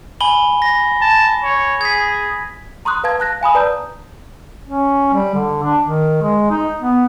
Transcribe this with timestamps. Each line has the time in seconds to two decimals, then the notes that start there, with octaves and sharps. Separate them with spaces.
0.21 G#5 B5 G7
0.62 A#6
1.01 A5
1.43 C#5
1.81 G#4 G#6 B6
2.85 A#5 C6 C#6 D#6 F#6
3.04 B4 F5 A5 G#6
3.20 A5 F#6 A#6
3.41 F5 G#5 B5 D#6
3.55 B4 D5 A5 A#5 D#6 G6
4.67 C#4
5.13 G3
5.34 D3
5.62 D4
5.83 D#3
6.22 G#3
6.50 D#4
6.81 B3